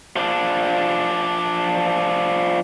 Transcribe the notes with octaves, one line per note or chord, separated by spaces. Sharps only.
F3 D4